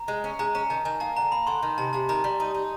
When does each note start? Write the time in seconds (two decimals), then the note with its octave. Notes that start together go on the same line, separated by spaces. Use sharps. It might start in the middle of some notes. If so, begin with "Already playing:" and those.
Already playing: A#5
0.08 G#3
0.24 C#4
0.39 G#3 A#5
0.55 C#4 A#5
0.70 D#3 A5
0.85 D#3 G#5
1.00 A#3 A5
1.16 D3 A#5
1.32 A#3 B5
1.47 D3 C6
1.63 D#3
1.78 C3 A5
1.93 C3 A5
2.09 D#3 A#5
2.24 G3
2.40 D#4
2.54 D#4